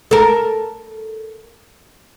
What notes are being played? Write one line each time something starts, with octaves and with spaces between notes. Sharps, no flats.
A4 A#4